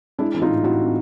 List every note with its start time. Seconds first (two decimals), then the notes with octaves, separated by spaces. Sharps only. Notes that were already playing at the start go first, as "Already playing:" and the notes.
0.19 G#3 D4 E4
0.34 E3 E4
0.42 D#4 F4
0.49 A2
0.64 A2 E4 F#4
0.79 C4